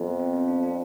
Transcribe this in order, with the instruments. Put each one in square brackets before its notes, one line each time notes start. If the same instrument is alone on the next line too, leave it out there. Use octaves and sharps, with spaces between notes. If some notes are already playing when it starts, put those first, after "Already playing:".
Already playing: [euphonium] F2 [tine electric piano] B3 C4
[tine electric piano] C4
C4
D4
D4